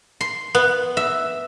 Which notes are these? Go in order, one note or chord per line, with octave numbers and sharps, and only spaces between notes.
C6
B3
E5